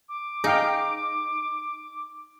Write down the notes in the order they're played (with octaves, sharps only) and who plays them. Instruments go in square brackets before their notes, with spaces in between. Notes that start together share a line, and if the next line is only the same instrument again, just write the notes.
[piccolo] D6
[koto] D#4 [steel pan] G#4 F5 G5